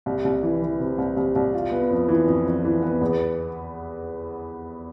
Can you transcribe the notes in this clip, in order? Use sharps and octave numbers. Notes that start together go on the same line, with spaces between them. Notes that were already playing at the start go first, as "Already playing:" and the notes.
C2
C2
E3
E3
C3
C2
C2
C2
F4
B3
F2
E3
F2
F2
E3
B3
E2